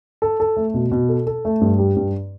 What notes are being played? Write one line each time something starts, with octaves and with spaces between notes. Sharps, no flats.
A4
A4
A3
B2
B2
A4
A4
A3
G2
G3
G2